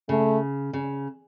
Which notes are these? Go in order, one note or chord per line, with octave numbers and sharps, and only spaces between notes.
C#3 A3
C#3